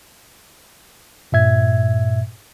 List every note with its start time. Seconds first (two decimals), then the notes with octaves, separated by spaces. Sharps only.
1.32 G2 A#2 E5 G#6